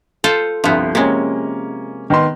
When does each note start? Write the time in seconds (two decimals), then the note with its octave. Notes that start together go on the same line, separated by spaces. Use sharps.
0.24 F4 A4 C5
0.64 G1 C2 F3 B3
0.95 C3 G#3 A#3 C#4
2.10 D#3 B3 C6